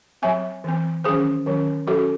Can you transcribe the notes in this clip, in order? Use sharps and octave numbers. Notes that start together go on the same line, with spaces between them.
F#3 C4 E5 G#5
E3 C4
D#3 F#3 C#4 G#4 C5
D#3 F#3 C#4
F#3 C#4 F#4 A4